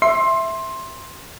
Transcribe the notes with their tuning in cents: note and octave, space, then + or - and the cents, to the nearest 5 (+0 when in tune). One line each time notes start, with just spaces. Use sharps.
E5 +0 C6 +15